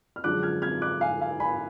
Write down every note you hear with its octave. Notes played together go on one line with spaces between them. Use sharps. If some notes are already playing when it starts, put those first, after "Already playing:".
F6
F#2 D3 F3 G#3 D4 D6 F#6
F6 G#6
F6 G#6
D6 F#6
F5 G#5
F5 G#5
G#5 B5